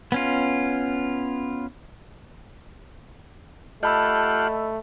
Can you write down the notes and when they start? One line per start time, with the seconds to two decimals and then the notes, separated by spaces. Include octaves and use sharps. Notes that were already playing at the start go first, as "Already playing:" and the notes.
0.12 B3 C#4 F4
3.83 A3 F4 G4 D#5 F#5 A5 B5 E6